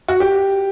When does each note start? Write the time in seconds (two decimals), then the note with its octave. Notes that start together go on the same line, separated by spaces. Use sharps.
0.08 F#4
0.20 G4